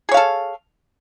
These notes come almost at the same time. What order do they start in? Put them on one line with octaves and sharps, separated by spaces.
G#4 C#5 F5 A4